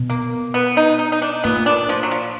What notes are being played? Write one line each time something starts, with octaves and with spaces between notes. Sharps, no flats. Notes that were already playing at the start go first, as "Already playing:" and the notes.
Already playing: B2
A#3
B3
D#4
D#4
D#4
D4
A#2 B3
D4
F3
F#3
F3